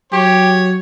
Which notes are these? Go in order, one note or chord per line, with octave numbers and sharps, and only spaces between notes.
F#3 G4 C#5